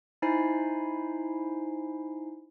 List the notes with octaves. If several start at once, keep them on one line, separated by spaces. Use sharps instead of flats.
D#4 E4 C5 G#5 B5 C7